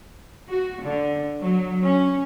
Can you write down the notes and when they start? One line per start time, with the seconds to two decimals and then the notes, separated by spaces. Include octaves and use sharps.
0.48 F#4
0.82 D3
1.41 F#3
1.83 C#4